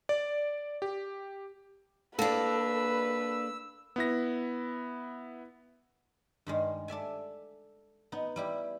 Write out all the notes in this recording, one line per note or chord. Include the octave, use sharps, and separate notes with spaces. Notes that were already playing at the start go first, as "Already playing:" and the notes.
D5
G4
A#3 D4 A4 B4 E6
B3 E4 A#6
G2 D#3 G#3
A4 D5 E5 G#5
B3 D#4
G3 E4 G4